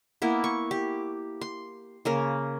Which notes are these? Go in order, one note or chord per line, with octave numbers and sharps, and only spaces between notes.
A#3 B3 E4
C#6
G4
C6
C#3 A#3 A#4